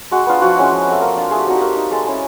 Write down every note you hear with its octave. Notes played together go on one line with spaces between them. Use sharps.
G#3 F#4
B3 D4 F4
F3 F#4
G#3 C#4 E4
F3
A3 C4
A#3
D4 F4
A3 G#4
G4
C4 D#4 F#4
G4
A#3
D#4
G#3 A4
C#4 E4 G#4